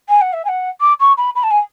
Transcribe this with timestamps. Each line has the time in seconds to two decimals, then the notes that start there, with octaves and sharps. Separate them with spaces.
0.09 G#5
0.21 F#5
0.33 E5
0.45 G#5
0.48 F#5
0.80 D6
1.00 C#6
1.17 B5
1.35 B5
1.43 A5
1.51 G#5